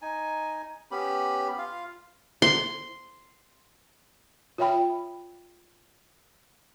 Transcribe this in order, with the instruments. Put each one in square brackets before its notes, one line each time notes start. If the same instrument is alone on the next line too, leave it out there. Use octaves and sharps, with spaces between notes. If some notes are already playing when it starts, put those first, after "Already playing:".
[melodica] D#4 G#5
B3 C#4 G4 B5
F4 F5
[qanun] C6
[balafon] F4 C#5 E5 G5 B5